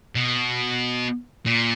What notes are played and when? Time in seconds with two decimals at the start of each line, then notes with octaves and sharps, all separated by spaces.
0.16 B2
1.46 A#2